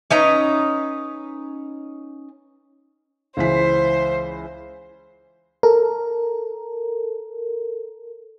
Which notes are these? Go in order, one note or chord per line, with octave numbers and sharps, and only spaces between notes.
C#4 D#4 B4 A#5
C#2 E3 C5 B6
A4 A#4